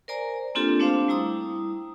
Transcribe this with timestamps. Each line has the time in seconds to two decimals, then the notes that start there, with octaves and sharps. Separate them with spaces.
0.08 A#4 C5 D5 G#5 A#5
0.55 A#3 C4 D4 F4 G4 A4
0.80 A3 C4 D4 C5 F5
1.08 G3 E4 A#5 D#6